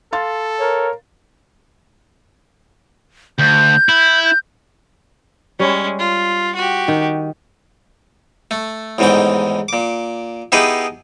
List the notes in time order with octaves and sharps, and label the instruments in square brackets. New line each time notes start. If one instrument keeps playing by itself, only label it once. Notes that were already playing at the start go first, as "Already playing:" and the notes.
[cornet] A4 [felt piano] F5 C6 A6
[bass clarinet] A#4 [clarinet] C#5
[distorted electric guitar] D2 [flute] G6
[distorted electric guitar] E4
[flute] G6
[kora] G3 C#5 [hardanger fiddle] G#3 C#4
[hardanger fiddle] F4
F#4 G4
[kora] D#3
[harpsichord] A3
A1 E2 G#2 D#3 E3 G5
A#2 D6
B3 D#4 E4 G4 G#4 B4